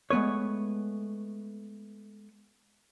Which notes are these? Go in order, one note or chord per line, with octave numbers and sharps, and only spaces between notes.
G#3 A3 B3 B4 C#5